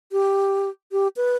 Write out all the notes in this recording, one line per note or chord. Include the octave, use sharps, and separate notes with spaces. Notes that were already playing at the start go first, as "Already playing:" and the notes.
G4
G4
B4